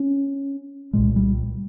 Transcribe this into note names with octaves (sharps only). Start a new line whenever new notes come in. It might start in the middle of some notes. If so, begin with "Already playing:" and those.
Already playing: C#4
C2 A#2 G#3
G3